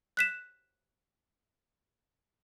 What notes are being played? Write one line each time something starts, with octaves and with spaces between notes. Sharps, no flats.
F#6 B6 E7